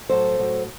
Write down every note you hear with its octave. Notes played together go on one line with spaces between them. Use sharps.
A2 F#3 A4 C5
A2 F#3